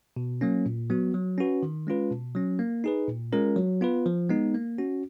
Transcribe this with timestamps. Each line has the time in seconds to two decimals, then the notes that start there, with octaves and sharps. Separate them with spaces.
0.16 B2
0.41 F#3 A#3 C#4
0.66 A#2
0.90 F#3 B3 F#4
1.14 F#3
1.38 C#4 F#4 B4
1.63 D#3
1.87 G#3 C#4 F4 B4
2.11 B2
2.35 F#3 C#4
2.59 A#3
2.84 D#4 G#4 B4
3.08 A#2
3.32 G#3 C#4 F4 A#4
3.56 F#3
3.81 B3 F4 B4
4.06 F3
4.29 G#3 B3 D#4
4.54 A#3
4.78 C#4 F#4